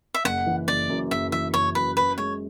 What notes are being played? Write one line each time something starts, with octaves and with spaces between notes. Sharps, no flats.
E5
F#1 F#5
E3
F#1 D5
F#2
F#1 E5
E3 E5
F#1 C#5
F#2 B4
F#2 B4
G#3 C#5